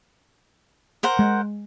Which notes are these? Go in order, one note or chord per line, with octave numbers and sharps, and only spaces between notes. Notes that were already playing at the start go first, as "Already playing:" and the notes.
A#4 C5 F#5
G#3